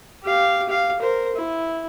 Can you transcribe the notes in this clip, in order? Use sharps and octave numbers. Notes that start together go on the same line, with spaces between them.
G4 F5
G4 F5
A#4 C5
E4